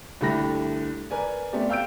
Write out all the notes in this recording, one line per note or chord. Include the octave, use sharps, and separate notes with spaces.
C2 D3 A3 G4 B5 A#6
A#4 B4 D5 G#5
A3 B3 C4 G4 D5
F5 G5 E6 G6 D7